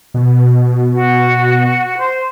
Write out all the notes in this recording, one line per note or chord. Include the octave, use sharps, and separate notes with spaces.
B2
F#4
C5